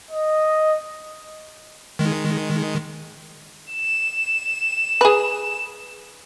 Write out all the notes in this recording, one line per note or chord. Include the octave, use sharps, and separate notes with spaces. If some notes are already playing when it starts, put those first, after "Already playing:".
D#5
D#3 G#3
E7
G#4 B4